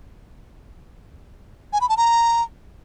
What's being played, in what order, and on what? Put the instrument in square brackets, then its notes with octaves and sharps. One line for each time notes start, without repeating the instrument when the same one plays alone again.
[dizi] G#5
B5
A5
A#5